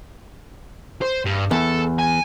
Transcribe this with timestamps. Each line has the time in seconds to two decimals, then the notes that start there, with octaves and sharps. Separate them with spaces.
1.02 C5
1.25 G2
1.51 E2 A4
1.99 G#5